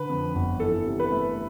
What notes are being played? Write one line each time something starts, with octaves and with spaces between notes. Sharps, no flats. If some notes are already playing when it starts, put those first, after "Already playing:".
Already playing: D3 B4
F2
G1
E3 A4
C3
B4
A3